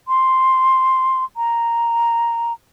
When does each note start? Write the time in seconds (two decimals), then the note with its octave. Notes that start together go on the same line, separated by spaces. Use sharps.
0.08 C6
1.37 A#5